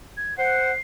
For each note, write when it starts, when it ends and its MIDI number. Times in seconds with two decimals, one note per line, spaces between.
0.17 0.37 92
0.38 0.72 72
0.38 0.72 78
0.38 0.80 96